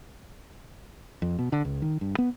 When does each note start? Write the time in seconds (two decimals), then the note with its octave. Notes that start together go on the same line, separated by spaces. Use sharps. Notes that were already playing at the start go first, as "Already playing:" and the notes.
1.22 F2
1.39 B2
1.52 D3
1.65 C#2
1.82 D#3
2.01 G2
2.18 B3